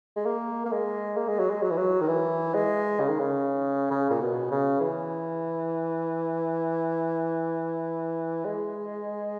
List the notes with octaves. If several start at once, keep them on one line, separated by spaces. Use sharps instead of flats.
G#3
A#3
A#3
G#3
A#3
G#3
F#3
G#3
F#3
E3
F#3
D#3
E3
G#3
C#3
D#3
C#3
C#3
A#2
B2
C#3
E3
G#3